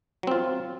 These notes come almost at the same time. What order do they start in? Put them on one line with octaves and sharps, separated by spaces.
F#3 C4 F4